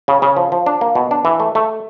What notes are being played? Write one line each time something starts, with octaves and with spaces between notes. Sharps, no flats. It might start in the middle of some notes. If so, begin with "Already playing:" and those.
C#3
C#3
F3
F3
D4
A#3
B2
D4
E3
A3
A3